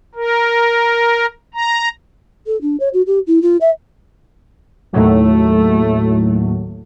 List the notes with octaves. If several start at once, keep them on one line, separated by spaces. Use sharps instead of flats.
A#4
A#5
A4
D4
C#5
F#4
G4
E4
F4
E5
D#2 A2 F#3 A3